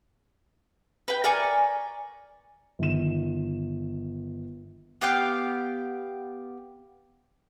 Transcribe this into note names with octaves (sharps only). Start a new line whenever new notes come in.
B4 G5
A#4 D5 G#5 C#6
G1 D#3 E7
B3 G4 F5 G5